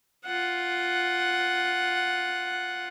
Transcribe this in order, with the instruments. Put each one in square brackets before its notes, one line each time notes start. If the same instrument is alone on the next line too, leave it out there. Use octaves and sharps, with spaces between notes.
[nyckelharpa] F4 F#5